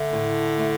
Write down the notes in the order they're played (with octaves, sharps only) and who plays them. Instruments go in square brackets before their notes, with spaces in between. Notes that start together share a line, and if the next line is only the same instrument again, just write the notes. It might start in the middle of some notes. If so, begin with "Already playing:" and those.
Already playing: [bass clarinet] D3 [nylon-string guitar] A3
[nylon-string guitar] A2
A3